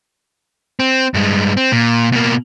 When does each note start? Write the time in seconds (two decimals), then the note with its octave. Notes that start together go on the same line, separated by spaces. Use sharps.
0.80 C4
1.14 G2 G#3
1.57 C4
1.72 A#2
2.12 B2 A#3